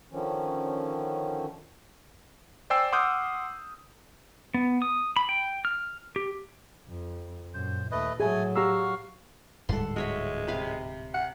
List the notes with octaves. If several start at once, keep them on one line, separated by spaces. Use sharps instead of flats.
D3 D#3 F3 C#4
C5 D5 G5 G#5 E6 C7
F#5 C6 D6 D#6 F6 G6
B3
D#6
B5
G5
F6
G4
F2
F#2 A#2 C5
D#2 A3 B4 D#5
A2 F#3 A3 G#4 G#5
F#4 G4 F5 A#5 E6
D1 G#2 G3 A4 F#5 C6
G#3 F#4 C#5 E5
C3 B4 F5
F#5